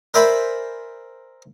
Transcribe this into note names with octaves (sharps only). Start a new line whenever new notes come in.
A#4 C5 D5 E5 G#5 B5